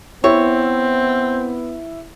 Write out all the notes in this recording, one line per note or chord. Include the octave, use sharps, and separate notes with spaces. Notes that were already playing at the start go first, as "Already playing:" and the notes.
B3 C4 E4 C#5